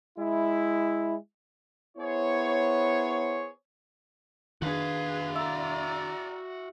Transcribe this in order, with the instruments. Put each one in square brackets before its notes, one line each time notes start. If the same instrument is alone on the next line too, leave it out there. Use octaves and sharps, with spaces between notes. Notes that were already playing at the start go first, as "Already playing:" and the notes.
[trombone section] G#3 E4
[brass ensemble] B3 E4 G#4 C5 C#5
[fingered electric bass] D#3 D4 [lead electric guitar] F#4 F5 [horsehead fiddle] G#4 B4
[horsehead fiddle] D5 A#5 [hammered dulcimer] E5